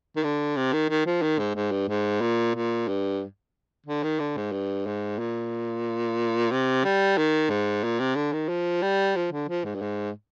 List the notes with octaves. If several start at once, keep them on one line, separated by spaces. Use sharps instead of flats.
D#3
D3
C3
D#3
D#3
F3
D#3
G#2
G#2
G2
G#2
A#2
A#2
G2
D3
D#3
D3
G#2
G2
G#2
A#2
C3
G3
D#3
G#2
A#2
C3
D3
D#3
F3
G3
F3
D3
F3
G#2
G2
G#2